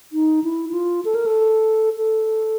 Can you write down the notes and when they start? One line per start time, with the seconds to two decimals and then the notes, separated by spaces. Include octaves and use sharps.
0.13 D#4
0.44 E4
0.70 E4
0.73 F4
1.05 A4
1.15 A#4
1.26 A4
1.97 A4